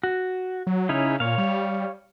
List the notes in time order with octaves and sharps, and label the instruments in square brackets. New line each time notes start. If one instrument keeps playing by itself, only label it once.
[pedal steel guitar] F#4
[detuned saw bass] F#3
[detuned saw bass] C#3 [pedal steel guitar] C#4 D#4 E4
[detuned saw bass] A#2 [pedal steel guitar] C#5 F5
[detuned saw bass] G3